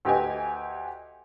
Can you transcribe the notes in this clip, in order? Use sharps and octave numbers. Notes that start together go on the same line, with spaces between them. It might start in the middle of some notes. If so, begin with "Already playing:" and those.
D2 G4 B4 D#5 G#5